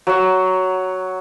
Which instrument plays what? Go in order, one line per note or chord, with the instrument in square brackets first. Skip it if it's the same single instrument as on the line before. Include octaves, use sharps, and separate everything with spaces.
[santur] F#3 F#5